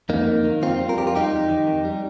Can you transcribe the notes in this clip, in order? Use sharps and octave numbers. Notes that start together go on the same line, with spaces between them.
F2 A#3 D#4
F2
D#3
F2 C4 F4
G3
A#4
F2 G4
F4
G3 D#4 G4
F2
D#3
F2
G3